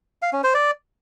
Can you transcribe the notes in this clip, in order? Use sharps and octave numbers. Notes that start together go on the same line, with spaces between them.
F5
C#4
C5
D5